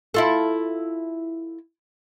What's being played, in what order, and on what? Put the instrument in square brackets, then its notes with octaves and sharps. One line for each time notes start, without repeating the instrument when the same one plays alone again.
[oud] E4 F4 A4